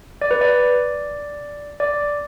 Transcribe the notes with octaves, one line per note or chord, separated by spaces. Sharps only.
D5
B4
D5
D5